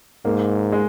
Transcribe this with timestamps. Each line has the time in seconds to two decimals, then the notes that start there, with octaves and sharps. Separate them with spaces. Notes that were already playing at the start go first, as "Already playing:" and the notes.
0.25 G#2 A#3
0.72 G#3